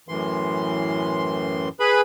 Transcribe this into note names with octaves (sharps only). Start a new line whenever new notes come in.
F#2 A2 E3 C6
G#4 B4 B5